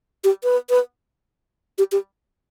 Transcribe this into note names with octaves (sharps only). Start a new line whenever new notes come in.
G4
B4
B4
G4
G4